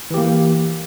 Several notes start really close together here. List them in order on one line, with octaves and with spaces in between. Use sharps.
E3 G4 A#3